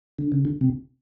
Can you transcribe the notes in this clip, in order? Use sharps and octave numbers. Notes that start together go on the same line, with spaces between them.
D3
C#3
D3
C3